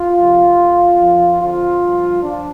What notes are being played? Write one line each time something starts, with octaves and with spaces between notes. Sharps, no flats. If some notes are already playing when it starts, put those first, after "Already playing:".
Already playing: F4
F2 C3 F3
F2 F3
F2 F3
F2 D3 F3 F4
G2 F3
F3 D4